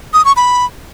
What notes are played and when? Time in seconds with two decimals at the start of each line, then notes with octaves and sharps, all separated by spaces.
0.14 D#6
0.25 C#6
0.36 B5